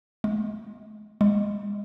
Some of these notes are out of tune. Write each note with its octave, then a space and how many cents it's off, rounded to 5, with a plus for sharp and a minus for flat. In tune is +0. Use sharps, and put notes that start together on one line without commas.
G#3 +30
G#3 -20